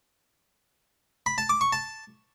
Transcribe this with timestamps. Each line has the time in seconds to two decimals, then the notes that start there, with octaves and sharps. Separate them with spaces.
1.26 B5
1.38 A5
1.49 D6
1.61 C#6
1.73 A5